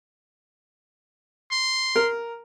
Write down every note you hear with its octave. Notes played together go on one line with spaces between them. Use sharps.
C6
A#4